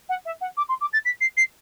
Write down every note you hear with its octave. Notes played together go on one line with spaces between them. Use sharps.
F#5
E5
F#5
D6
C6
D6
A6
B6
C7
C7